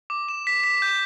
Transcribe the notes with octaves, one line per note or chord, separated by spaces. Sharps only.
D6
E7
B6
B6
G6